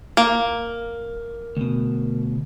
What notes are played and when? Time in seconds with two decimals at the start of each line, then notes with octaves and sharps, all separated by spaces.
0.17 A#3
1.57 D2 B2